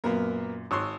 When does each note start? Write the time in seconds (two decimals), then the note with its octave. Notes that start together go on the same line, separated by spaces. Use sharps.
0.04 F#2 A#2 A#3 B3 A#4
0.71 G#1 C#5 C6 D#6 E6 F#6